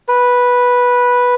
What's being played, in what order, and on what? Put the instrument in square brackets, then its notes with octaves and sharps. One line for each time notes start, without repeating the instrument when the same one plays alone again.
[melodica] B4